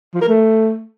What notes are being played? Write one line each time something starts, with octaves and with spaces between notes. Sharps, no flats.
F3
A#4
A3